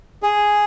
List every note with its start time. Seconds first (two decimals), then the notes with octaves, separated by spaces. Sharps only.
0.23 G#4